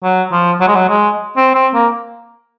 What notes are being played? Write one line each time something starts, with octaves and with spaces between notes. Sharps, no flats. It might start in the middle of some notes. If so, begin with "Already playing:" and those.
F#3
F3
F#3
G#3
F#3
G#3
C4
C4
A#3